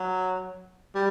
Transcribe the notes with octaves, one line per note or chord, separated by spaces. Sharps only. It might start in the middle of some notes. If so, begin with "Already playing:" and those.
Already playing: F#3
G3